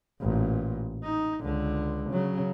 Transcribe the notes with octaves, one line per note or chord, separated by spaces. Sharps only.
A1 A#2
D#4
C#2 D3
C#3 F#3